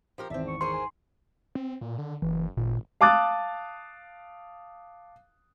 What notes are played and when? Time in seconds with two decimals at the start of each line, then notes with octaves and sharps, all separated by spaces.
0.18 F3 G4 A#4
0.30 G#1 E2 C4 D4 E5
0.47 C#6
0.61 G#4 A#4 C5 C6
0.73 G#5
1.55 C4
1.81 A#2
1.98 D3
2.22 F#1 E3
2.57 G#1 A#2
3.01 F5 A5 D6 D#6 F#6 A6